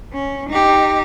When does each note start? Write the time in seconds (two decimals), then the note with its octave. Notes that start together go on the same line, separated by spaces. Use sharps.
0.13 C#4
0.49 D#4 G4